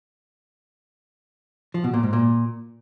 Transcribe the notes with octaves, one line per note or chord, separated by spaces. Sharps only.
F3
B2
A#2
G#2
A#2